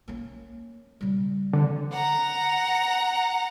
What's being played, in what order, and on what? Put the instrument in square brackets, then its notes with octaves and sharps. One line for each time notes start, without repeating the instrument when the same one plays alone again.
[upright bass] A#3 C#4
C#3 G3
[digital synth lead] D3
[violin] F#5 A#5